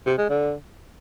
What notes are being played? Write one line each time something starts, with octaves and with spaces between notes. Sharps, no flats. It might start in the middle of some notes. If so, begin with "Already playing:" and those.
C3
G#3
D3